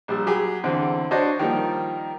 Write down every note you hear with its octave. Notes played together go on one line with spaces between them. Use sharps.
A#1 G3 E6
F#3 G4 G#4
E2 D3 C4
D4 F#4 C5 C#5 D#5
D#3 F3 G3 A#3 D#4